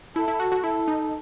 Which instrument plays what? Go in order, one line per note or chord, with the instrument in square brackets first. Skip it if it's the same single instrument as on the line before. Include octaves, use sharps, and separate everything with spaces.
[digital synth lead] E4 [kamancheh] A4
[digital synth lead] E4
F#4
F#4
[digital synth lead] E4 [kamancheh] A4
[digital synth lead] D#4